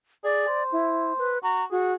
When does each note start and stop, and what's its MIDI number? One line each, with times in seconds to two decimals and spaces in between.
0.24 0.47 68
0.24 0.63 74
0.48 1.35 72
0.72 1.13 64
1.18 1.38 71
1.43 1.65 66
1.43 1.65 82
1.71 1.94 66
1.71 1.93 68